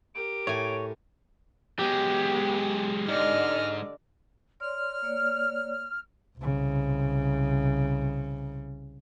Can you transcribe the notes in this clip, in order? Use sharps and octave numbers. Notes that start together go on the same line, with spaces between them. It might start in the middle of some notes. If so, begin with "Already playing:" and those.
G4 A#4 D7
A2 C#5 G#5
F#3 G#3 B3 G4
G#2 D3 D5 D#5 F6
C#5 D5 C6 F6
A#3 C#5 D5
C2 C#3